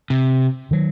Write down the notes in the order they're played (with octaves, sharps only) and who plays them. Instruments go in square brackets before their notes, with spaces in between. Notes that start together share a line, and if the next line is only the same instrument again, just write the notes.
[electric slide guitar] C3
[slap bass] D#3 F#3